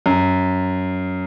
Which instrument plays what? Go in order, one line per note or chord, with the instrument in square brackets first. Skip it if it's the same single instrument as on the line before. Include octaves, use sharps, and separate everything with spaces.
[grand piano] F#2